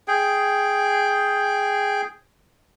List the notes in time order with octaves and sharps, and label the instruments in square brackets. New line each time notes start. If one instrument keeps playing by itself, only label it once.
[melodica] G#4 G5